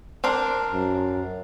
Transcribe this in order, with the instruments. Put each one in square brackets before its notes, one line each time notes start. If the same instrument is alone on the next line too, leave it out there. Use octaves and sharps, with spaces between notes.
[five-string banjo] C4 D4 A#4
[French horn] F#2